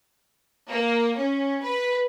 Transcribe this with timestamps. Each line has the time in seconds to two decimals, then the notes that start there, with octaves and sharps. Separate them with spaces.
0.69 A#3
1.16 C#4
1.62 B4